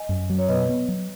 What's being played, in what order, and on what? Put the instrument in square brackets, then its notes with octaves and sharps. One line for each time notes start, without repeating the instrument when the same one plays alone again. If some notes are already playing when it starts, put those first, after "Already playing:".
Already playing: [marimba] D#5 G#5
[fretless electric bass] F#2
F#3
[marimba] C#5
[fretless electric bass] B2 [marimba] B4 D#5
[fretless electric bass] B3
F#3